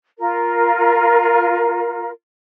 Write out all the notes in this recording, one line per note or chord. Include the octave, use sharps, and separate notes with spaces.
F4 A#4